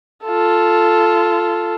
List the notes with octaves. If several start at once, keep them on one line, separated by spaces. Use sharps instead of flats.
F4 A4